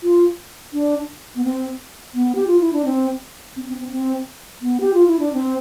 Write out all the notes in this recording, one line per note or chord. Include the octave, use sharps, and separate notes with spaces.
F4
D4
B3
C4
B3
G4
F4
E4
D4
C4
C4
C4
C4
C4
B3
G4
F4
E4
D4
C4